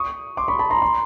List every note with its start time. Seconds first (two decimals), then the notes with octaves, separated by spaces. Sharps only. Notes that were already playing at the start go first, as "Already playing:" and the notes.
Already playing: C#6 D#6
0.37 C6 D6
0.48 B5 C#6
0.59 A5 B5
0.70 A#5 C6
0.82 A#5 C6